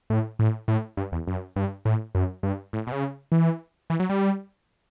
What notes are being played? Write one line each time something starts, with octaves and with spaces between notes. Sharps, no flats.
A2
A2
A2
G2
E2
F#2
G2
A2
F#2
G2
A2
B2
C#3
E3
E3
F#3
G3